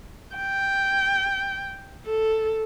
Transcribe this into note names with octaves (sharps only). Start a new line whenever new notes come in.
G5
A4